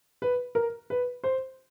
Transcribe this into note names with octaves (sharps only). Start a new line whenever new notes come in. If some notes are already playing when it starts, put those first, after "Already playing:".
B4
A#4
B4
C5